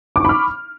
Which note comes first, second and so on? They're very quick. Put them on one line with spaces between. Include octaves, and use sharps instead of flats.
D6 C#6 B5 F6